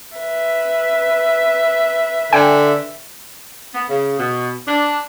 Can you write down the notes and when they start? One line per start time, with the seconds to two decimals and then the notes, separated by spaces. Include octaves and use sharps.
0.18 B4 E5
2.33 D3 G5 G#5
3.74 B3
3.89 C#3
4.19 B2
4.68 D4